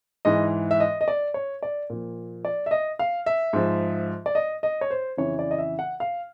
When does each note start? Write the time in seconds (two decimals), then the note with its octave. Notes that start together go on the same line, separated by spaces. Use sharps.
0.25 G#2 E3 D#5
0.71 E5
0.80 D#5
1.01 D#5
1.08 D5
1.34 C#5
1.63 D5
1.90 A#2 F3
2.45 D5
2.66 E5
2.71 D#5
2.99 F5
3.26 E5
3.53 G#2 F3
4.26 D5
4.35 D#5
4.63 D#5
4.81 C#5
4.90 C5
5.17 F2 C#3 E3 C#5
5.39 D5
5.51 D#5
5.58 E5
5.79 F#5
6.00 F5